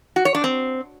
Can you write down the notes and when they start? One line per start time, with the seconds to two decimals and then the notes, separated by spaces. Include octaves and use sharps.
0.16 F#4
0.25 C#5
0.35 D4
0.44 C4